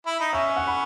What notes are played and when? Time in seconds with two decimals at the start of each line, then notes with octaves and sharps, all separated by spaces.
0.07 E4
0.20 D#4
0.33 C#4 E5
0.56 F#5
0.67 B5